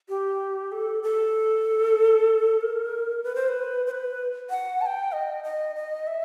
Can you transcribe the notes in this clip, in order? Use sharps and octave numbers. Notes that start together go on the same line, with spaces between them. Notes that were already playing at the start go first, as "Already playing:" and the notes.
G4
A4
A4
A#4
B4
C5
B4
C5
B4
F#5
A5
G5
D#5
D#5
D#5
E5